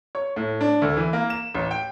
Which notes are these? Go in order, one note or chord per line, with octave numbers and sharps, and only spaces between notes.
C#5
A2
D4
D2
E3
A#3
E7
A1
G5